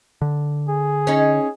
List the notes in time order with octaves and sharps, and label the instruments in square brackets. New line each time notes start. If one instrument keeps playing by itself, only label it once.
[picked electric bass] D3
[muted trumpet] G#4
[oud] C#4 D#4